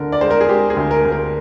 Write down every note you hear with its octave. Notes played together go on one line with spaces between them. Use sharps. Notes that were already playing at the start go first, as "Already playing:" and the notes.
Already playing: D2 D3 A#4
D5
G#3 C5
A#4
G#4
G#3 G4
G#4
D2
A#4
D2
A#4